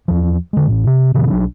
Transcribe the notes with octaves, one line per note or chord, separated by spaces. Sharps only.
E2 F3
D3 G#3
A1 A2
C3
A2 C3 D#3 F3
B1 F#3 D4